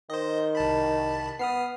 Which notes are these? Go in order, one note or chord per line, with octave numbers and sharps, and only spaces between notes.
D#3 C5 D#5
C2 A5 B5
B3 D#6 F6 C7